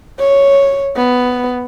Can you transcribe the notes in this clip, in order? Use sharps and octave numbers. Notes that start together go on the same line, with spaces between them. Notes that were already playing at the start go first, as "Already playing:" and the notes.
C#5
B3